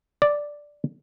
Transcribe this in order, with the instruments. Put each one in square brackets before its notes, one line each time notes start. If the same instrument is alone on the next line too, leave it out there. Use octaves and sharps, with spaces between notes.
[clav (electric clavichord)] D5